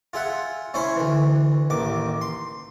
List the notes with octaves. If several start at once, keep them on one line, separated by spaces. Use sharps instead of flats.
F4 G#4 E5 F#5
C#4 E4 C5 C#5 G#5 B5
D2 E3
A1 D#2 D6
C6